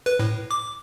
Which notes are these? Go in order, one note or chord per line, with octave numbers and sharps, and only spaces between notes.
B4
A2
D6